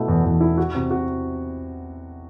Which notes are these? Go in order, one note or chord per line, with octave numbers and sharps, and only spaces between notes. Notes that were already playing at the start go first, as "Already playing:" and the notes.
Already playing: B2 A3 E4
E2
E2
E4
F#4
C3
F#4